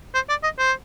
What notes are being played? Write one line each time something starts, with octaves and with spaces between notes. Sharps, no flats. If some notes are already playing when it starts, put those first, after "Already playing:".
C5
D5
D#5
C5